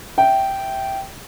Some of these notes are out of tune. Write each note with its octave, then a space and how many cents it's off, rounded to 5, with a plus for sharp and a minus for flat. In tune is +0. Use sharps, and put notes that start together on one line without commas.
E5 +0 G5 -10